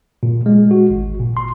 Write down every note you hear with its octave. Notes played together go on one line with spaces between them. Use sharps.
A#2
G#3
F#4
G#1
A#2
C6